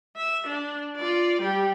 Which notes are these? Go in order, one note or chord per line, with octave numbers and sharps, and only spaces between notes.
E5
D4
F4 D5
G3 G4